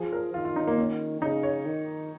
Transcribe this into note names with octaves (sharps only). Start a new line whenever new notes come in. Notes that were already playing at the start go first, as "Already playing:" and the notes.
Already playing: F3 G#4
A#4
D#3 F4
F4
D#4
A#3
C#4
C#3 D#4
C#5
D#3